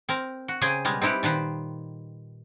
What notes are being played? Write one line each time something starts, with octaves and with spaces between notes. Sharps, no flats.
C4 A#4
F#4
C#3 C4 G#4 G5 G#5
B2 G3 G#3
C4 D#4 E4 G4 B4
A#2 D#3 B4 C5